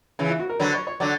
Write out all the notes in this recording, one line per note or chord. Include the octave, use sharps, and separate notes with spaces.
C#3 E3
E4
F#4
A#4
D3 F#3 B4
C#5
C#5
D3 F#3 D5